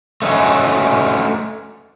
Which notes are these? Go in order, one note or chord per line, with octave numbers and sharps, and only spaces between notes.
A3 C#4 D#4 F#4